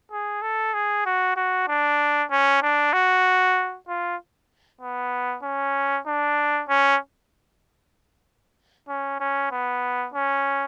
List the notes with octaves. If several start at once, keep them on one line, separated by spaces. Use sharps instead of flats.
G#4
A4
G#4
F#4
F#4
D4
C#4
D4
F#4
F4
B3
C#4
D4
C#4
C#4
C#4
B3
C#4